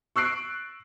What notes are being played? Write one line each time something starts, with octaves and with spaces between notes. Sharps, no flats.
C#6 E6 F#6 C7 D7